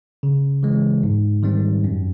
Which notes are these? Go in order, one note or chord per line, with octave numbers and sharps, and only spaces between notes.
C#3
E3 G#3
G#2
D#3 G3 C4
F#2